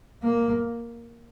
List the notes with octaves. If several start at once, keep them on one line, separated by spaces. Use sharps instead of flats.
A#3